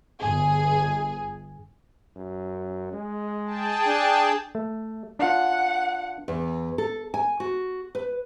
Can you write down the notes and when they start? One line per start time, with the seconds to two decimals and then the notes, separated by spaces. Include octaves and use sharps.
0.22 G1 G#4
2.16 F#2
2.93 G#3
3.46 G#4 G5 A5
3.86 D4
4.55 A3
5.19 D4 F4 F#5
6.28 E2
6.78 A4
7.14 G#5
7.40 F#4
7.95 B4